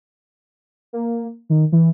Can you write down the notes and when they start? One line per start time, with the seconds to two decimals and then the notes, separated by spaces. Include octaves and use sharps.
0.93 A#3
1.50 D#3
1.72 E3